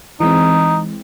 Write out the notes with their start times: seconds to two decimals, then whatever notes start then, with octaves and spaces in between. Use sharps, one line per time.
0.20 E3 G#3 C4 D#4